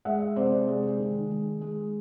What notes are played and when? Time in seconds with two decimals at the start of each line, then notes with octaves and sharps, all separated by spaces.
0.05 G#3 E5 F#5
0.36 C3 C5 D5
0.68 G#3
0.99 D#3
1.30 G#3
1.61 G#3